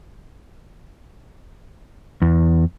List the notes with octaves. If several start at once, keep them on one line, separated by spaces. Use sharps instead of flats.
E2